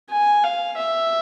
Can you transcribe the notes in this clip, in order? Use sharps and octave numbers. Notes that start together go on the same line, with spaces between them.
G#5
F5
E5